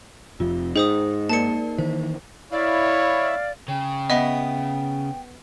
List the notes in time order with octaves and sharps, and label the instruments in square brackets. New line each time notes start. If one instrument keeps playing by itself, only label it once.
[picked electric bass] F1 F2 C3 [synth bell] F4
[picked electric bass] G#2 [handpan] D#4 [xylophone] G#4 C5 D#6 [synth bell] D#5 G5
[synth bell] A#3 A#4 D5 [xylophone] A5 C#7
[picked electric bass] D#3 E3 [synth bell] C5
[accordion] E4 [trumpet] C#5 [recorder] D5 [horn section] F5
[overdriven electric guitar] C#3 [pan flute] G5
[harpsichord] B3 [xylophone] D#5 E5